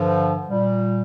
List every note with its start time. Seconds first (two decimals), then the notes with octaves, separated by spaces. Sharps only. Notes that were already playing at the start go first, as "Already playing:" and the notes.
Already playing: G2 D3 F3
0.48 A#2 G3